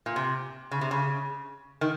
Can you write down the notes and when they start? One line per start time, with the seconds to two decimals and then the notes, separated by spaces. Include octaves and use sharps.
0.06 A#2
0.16 C3
0.71 C#3
0.81 C3
0.91 C#3
1.81 D#3